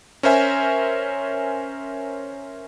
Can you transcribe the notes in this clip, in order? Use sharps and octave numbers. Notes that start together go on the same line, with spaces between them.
C#4 A#4 C5 E5 G#5